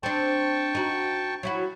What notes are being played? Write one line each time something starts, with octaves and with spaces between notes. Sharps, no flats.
C4 D4 G5 A5 C#6
D#4 F#4
F#3 E4 F#4